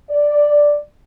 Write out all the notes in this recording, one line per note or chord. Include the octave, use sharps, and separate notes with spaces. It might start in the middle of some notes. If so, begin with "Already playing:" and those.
D5